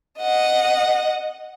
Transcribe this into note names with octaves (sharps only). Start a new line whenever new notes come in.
D#5 F#5